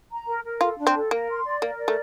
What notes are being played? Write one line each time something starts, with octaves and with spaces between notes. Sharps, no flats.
A#5
A#4
A#4
F4 A4
D4
C4
A4
A#3 A#4
C6
D5
A#3 A#4
D5
A3